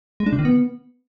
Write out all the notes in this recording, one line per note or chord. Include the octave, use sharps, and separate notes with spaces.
G#3
D4
C3
D#3
B3